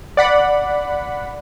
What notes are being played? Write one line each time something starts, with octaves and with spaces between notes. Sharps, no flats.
D5 F#5 B5